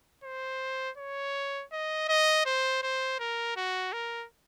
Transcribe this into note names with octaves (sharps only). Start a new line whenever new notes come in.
C5
C#5
D#5
D#5
C5
C5
A#4
F#4
A#4